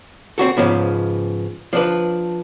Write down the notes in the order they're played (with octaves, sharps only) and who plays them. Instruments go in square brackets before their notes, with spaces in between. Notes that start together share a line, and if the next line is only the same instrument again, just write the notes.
[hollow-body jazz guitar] C4 D4 F#4 A4
G#2 C#3 F3 B3
F3 D4 B4